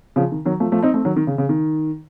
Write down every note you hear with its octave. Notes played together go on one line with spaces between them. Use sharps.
C#3 F3
D#3
D#3 F#3
F3 A3
F3 A3
C4 D#4
A3 C4
D#3 F#3
D#3
C#3
C#3
D#3